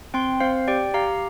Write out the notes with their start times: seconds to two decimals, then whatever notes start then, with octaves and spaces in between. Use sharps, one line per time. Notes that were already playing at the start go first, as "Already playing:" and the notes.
0.14 C4 G5 C6
0.40 C4 C5 F5
0.68 G4 D5 G5
0.94 G4 F5 A#5